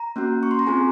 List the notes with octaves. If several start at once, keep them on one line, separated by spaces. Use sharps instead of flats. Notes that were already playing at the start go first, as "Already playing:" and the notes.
Already playing: A#5
A#3 C#4 F#4
C#6
C6
A#5
C4 F4 G#4 G#5